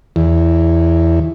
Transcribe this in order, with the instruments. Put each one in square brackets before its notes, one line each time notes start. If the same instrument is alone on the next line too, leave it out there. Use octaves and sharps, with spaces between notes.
[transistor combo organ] E2